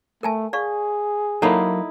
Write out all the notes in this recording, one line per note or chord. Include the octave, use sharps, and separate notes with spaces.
A3 A#4 G#5 A5
G#4 D5 F5 C#6
F#3 A#3 D#4 E4 A4 F#5 A5